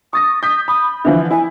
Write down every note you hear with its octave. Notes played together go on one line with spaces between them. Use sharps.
C#6 D#6 A6 A#6
D#6 G6 B6
B5 D#6
D3 E3 F3 E5
E4 G#5